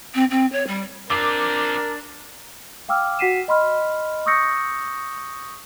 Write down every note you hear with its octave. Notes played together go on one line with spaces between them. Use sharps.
C4
C4
C#5
G3
F3 C4 D4 A#4 D6
F5 G5 D6 E6 F6
F#4 F#5 B6 C7 D#7 E7
D#5 B5 C6 F6
C#6 D#6 E6 G6 A#6 C#7